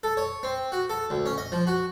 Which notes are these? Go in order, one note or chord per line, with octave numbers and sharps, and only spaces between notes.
A4
C#5
C4
F#4
A4
D2
C#4
D#5
F3
F#4